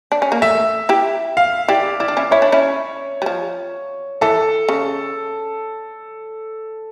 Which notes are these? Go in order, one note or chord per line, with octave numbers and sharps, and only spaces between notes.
D4
C#4
A#3
A3 E5
E4 G4
F5
E4 G4 D5
E4 D5
D4
C#4 E4
E4 C#5
D4
C#4 E4
G3
F3
E3 A4
C#3